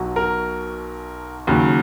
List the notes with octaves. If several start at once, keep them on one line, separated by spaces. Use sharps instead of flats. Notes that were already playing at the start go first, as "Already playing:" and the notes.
Already playing: B1 B2 F#3
A#4
D#2 C#3 F#3